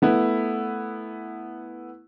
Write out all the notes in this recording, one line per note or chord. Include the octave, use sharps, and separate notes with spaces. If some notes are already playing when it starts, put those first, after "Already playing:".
A3 B3 E4